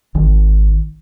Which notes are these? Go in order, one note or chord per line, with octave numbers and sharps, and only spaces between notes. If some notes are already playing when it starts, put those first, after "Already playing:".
G#1 D#3